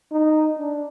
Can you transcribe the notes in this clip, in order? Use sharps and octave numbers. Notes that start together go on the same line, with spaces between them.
D#4
D4